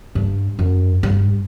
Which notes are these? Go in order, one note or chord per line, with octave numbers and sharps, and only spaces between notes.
G2
F#2
G2